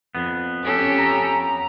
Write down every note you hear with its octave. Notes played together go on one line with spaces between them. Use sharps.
F2 B3
C#4 G4 A4
A#5